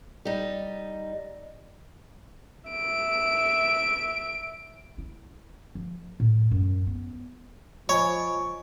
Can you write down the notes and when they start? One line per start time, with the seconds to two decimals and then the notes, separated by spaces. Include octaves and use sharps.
0.25 G3 D#4
2.70 E5 D7
4.98 E4
5.75 F3
6.20 A2
6.51 F#2
6.87 B3
7.89 F3 C#5 D#5 G#5 B5 C#6